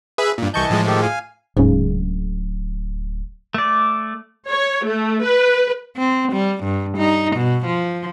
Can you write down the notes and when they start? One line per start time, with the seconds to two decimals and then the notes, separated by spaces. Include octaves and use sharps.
0.18 G#4 B4 E5
0.38 G2 A#2
0.54 C2 E3 D#5 A5 C#6 G6
0.70 A2 F3 G#3
0.86 D#3 G4 A4
1.02 F5 G#5
1.57 D1 G#2 C#3
3.54 A3 D5
4.47 C#5
4.84 A3
5.23 B4
5.97 C4
6.33 G3
6.64 G2
6.98 D#4
7.37 B2
7.66 F3